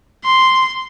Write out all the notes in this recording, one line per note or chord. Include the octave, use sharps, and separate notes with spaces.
C6